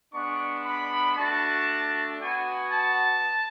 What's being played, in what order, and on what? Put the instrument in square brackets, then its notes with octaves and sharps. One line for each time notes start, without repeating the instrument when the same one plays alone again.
[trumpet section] G#3 B3 D4 C#6
B5
A3 D4 F#4 A5
B3 F#4 G#5
A5